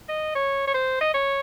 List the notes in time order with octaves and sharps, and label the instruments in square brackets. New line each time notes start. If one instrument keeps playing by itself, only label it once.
[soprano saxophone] D#5
C#5
C#5
C5
D#5
C#5